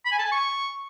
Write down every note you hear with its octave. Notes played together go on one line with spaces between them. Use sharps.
B5
G#5
A5
G#5
C#6